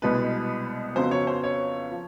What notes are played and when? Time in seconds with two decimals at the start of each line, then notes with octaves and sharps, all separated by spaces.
0.02 C2 B2 G#3 B3 B4
0.95 F2 C#3 F#3 B3 C5
1.11 C#5
1.27 C5
1.44 C#5
1.91 F3